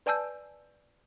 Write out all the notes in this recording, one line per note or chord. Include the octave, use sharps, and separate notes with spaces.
B4 D5 G#5 A5 E6 G6